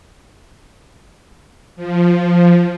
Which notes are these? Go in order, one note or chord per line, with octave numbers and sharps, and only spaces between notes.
F3